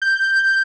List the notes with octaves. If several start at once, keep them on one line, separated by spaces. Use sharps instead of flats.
G6